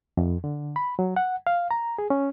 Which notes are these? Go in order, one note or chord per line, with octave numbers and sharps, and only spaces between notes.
F2
D3
B5
F#3
F#5
F5
A#5
G#4
C#4